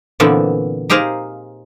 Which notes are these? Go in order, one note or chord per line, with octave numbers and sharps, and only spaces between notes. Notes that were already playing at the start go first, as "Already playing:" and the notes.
A#2 D3 E3 B3 C4
D#4 G4 G#4 A#4 C5 F5